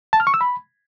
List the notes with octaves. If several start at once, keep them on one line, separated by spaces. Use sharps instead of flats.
A5
F6
C#6
E6
B5